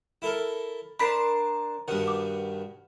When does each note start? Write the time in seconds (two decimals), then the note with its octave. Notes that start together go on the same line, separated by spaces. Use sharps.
0.22 E4 A4 A#4
0.99 D4 A#4 C5 A5 B5 B6
1.88 G2 B2 D#3 F#5
2.08 D6